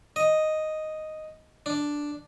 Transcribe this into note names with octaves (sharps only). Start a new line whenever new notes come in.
D#5
D4